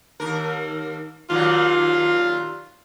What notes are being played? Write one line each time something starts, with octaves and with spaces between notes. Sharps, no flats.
D#2 A#4
D#2 A#2 F#3 F4